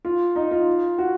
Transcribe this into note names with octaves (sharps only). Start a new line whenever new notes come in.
F4
D#4
F4
F#4